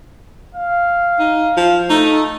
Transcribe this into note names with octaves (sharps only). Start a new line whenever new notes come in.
F5
D#4
F3
A3 D#4